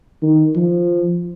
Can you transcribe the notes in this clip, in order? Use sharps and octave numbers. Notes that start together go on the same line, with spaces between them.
D#3
F3